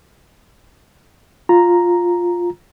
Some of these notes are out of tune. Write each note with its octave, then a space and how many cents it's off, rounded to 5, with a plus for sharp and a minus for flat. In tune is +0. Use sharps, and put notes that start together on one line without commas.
F4 +5 A#5 +0